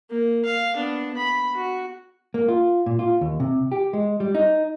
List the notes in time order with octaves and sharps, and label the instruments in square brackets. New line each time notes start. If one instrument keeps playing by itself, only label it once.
[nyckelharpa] A#3
F5
B3 D4
B5
F#4
[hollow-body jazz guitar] A#3
F4
A#2
F4
D#2
C3
G4
G#3
G3
D#4